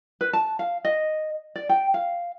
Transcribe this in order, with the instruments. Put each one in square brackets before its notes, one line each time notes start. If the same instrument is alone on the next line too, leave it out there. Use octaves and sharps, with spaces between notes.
[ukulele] B4
A5
F5
D#5
D5
G5
F5